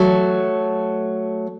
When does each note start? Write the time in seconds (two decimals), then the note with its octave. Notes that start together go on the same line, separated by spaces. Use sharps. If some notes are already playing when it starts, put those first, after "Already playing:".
Already playing: F#3 A3